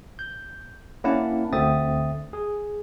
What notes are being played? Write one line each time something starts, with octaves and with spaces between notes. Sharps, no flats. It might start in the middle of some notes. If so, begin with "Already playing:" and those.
G6
A#3 C#4 D4 E4 F#5 A5
D2 D3 C4 E5 D#6 A6
G#4